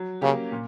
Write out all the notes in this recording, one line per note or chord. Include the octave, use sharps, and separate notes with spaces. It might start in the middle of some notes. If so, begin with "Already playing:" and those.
Already playing: F#3
C#3 A#3 C#4 G4
A#2